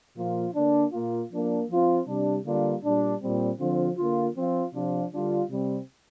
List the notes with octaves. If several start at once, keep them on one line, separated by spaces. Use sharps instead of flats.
A#2 F3 A#3 F4
D3 A#3 D4
A#2 A#3 F4
F3 A#3 D4
F3 C4 F4
C3 G3 D4
D3 G3 A#3 D4 F4
A#2 G3 D4
A#2 G3 C4
D3 F3 C4 F4
D3 A#3 F4
F3 C4 F4
C3 F3 D4 F4
D3 G3 D4 F4
C3 G3 C4